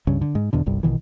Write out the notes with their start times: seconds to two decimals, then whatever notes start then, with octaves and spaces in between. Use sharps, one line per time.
0.07 C#2 G2 C#3
0.22 D3
0.35 G#2
0.53 E2 B2 D3
0.66 G1 C2 G2
0.83 A#1 B2 D#3 E3